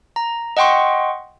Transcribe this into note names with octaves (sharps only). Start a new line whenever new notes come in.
A#5
D#5 F#5 G5 C6 C#6